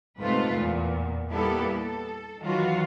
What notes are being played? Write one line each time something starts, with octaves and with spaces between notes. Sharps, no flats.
G#2 C3 A3 F4 B4
E2 A#2
G3 A#3 B3 E4 G4 A4
A4
D#3 E3 F#3 F4 F#4